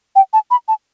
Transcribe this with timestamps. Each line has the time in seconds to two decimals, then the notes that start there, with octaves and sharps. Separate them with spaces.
0.16 G5
0.33 A5
0.51 B5
0.68 A5